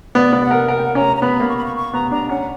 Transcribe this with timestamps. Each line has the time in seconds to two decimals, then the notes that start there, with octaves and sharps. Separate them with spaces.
0.15 B3 D5
0.33 B3
0.42 F#5
0.51 A#4
0.68 A#4 F#5
0.77 G5
0.84 F#5
0.95 C#4 A#5
1.16 A#5
1.22 B3 B5
1.40 A#3
1.48 C#6
1.57 B5
1.65 C#6
1.76 C#6
1.93 B3 A#5
2.11 D4 A#5
2.29 C#4 F#5